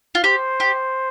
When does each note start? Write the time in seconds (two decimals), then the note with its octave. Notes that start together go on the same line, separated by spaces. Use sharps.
0.15 F4
0.24 G4 C5
0.60 G4